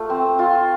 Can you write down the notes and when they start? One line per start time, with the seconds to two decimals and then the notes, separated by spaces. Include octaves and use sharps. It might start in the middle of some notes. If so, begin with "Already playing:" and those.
Already playing: A3 F4
0.10 C4
0.39 F4